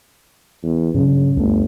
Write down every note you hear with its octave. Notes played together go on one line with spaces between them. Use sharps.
E2
G2 A#2 C#3 F#3
G1 C#2 F#2 A3